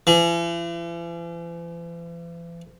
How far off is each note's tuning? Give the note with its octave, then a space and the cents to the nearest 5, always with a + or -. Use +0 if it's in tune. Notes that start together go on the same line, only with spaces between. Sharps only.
E3 +45